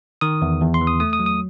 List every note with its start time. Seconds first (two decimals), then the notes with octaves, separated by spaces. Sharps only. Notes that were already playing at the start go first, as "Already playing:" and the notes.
0.21 D#3 D#6
0.42 E2
0.61 E2
0.74 C6
0.81 E3
0.87 D#6
1.00 A3 D#6
1.13 D#6
1.19 F#3
1.26 D#6